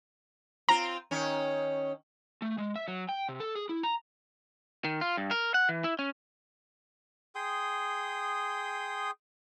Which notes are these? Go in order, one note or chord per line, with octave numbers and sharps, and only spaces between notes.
C4 F4 A#5
D#3 C#4
A3
G#3
E5
F#3
G5
C3
A4
G#4
E4
A#5
D#3
F4
G2
A#4
F#5
E3
E4
C#4
G#4 G5 C6 D#6